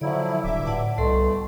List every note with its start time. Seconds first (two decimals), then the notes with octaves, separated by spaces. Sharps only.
0.01 D3 F3 F#3 E4 D5
0.44 D1 G2 E5 D6
0.67 A2 D5 F#5 A5
0.98 C2 B2 G3 A3 A4 C6